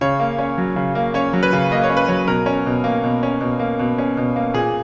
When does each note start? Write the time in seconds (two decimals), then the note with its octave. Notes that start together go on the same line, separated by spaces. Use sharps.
0.01 C#3 C#5
0.20 A#3
0.38 C#4
0.58 F#3
0.76 C#3
0.95 A#3
1.14 C#4 C#5
1.33 F#3
1.43 B4
1.53 C#3
1.71 A#3 D#5
1.84 C#5
1.90 C#4
1.97 B4
2.08 F#3 C#5
2.28 B2 A#4
2.46 C#4
2.66 B2
2.84 A#3
3.04 B2
3.23 C#4
3.41 B2
3.59 A#3
3.79 B2
3.98 C#4
4.17 B2
4.36 A#3
4.54 A#2 G#4